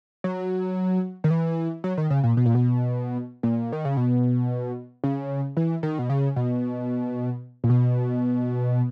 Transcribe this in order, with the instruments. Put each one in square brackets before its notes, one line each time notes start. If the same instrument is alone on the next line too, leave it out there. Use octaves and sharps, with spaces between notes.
[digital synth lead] F#3
D#3
E3
F#3
D#3
C#3
A#2
B2
A#2
B2
A#2
D#3
C#3
B2
C#3
E3
D#3
B2
C#3
B2
A#2
B2